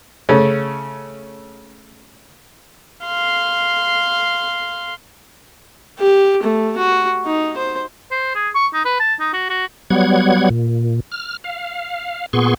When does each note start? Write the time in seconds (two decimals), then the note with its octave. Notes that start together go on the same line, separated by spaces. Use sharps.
0.29 C#3 A3 C#4
3.05 F5 C6
5.99 G4
6.43 A3
6.78 F#4
7.26 D#4
7.57 C5
8.11 C5
8.35 G#4
8.55 C#6
8.74 D#4
8.85 B4
9.00 A5
9.20 D#4
9.33 F#4
9.49 F#4
9.90 F#3 G3 B3 F#5 G#6
10.50 A#2
11.12 F6
11.44 F5
12.33 A#2 B3 G#4 C6 C#6